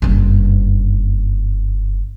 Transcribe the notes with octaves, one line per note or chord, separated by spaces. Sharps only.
F#1 G2